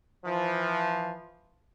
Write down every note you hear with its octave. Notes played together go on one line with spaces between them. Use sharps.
E3 F3